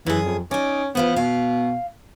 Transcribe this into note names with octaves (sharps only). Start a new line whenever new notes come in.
F#2 E3 G#4
F2
C#4 D#4 D5
E3 B3 F4 C5
B2 F5